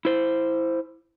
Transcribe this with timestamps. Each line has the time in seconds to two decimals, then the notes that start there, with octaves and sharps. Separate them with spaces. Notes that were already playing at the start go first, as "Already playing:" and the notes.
0.05 E4 C5